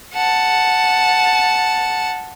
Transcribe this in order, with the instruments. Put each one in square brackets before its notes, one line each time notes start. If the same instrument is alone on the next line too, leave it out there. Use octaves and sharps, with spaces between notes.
[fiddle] F#5 A5